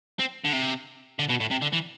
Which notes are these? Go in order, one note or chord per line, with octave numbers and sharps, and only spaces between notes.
C4
D3
C3
D3
B2
A2
C3
D3
E3